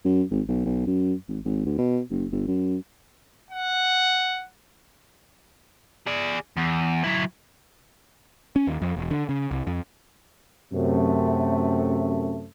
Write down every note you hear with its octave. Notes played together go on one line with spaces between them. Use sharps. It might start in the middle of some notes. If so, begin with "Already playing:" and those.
F#2
G#1
B1
B1
F#2
G#1
G#1
D2
B2
F#1
G1
F#2
F#5
G#4 D5
E2
F#3 E4
C#4
D#2
F2
E1
D3
C#3
C2
F2
F#2 C3 A3